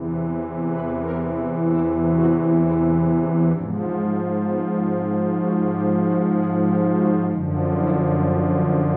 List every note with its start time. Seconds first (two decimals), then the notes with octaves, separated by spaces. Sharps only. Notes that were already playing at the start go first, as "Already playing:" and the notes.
Already playing: E2 C3 E3
0.71 B4
1.02 A#4
1.33 E4
1.65 E4
2.12 F#4
2.58 E4
3.52 G#2 F3 D4
3.84 G#3
4.15 A3
4.47 B3
4.94 C4
5.41 F#4
5.73 G4
6.04 F#4
6.35 G#4
6.66 G4
6.98 F#4
7.29 F#2 D3 F3
7.76 E4